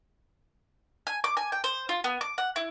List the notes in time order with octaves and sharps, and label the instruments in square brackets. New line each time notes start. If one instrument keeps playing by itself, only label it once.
[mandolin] G#5
D6
G#5
G5
C5
F4
B3
D6
F#5
E4